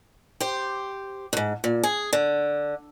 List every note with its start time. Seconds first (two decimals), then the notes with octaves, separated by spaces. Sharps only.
0.40 G4 C5
1.33 D2 G#2
1.64 A#2
1.83 G#4
2.13 D3